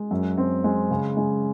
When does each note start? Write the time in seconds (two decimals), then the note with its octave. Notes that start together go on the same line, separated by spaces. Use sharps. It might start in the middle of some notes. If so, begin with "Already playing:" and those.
Already playing: G#3
0.11 F#2
0.38 C4
0.64 G#3
0.91 C#3
1.17 G#3